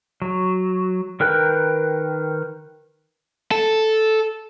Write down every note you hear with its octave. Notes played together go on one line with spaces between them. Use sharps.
F#3
D#3 A#4 B4 G5 F#6
A4